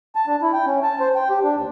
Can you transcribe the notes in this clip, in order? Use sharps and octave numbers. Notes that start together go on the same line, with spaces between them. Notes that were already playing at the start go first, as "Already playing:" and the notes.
A5
D4
E4
G5
C#4
A5
C5
G5
G4
D4
D#2